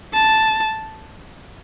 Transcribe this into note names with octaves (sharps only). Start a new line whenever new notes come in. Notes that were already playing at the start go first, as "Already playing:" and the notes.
A5